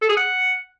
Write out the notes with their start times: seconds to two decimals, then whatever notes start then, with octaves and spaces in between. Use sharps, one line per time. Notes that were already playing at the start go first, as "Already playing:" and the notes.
0.02 A4
0.09 G#4
0.17 F#5